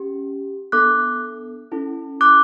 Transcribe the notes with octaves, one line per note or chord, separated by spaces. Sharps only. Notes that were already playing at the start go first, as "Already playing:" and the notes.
Already playing: C#4 G4
B3 D4 A4 D6 F#6
C#4 E4 A4
D6 F#6